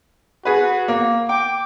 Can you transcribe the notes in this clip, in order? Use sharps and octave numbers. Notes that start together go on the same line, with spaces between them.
F#4 G#4 B4
A#3
G5 D6